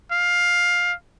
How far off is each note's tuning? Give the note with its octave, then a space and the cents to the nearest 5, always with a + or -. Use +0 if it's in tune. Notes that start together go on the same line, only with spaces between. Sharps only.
F5 +15